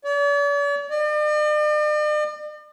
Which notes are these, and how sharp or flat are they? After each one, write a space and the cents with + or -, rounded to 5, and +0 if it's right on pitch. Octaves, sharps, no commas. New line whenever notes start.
D5 -45
D5 +45